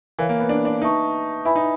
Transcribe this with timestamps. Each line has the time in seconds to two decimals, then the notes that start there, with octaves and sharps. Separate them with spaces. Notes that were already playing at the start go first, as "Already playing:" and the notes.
0.19 E3 A#4 C#5 F5
0.29 A#3
0.40 B3
0.49 D4
0.65 D4
0.81 D#4 B4 E5 A5 C#6
1.45 E4 B4 E5 G#5 B5
1.56 D#4